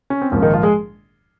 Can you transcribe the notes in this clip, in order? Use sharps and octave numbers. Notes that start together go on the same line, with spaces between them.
C#4
C4
A#1 G#2 F3 A#3 C#4
D#3 D#4
F3 F4
G#3 G#4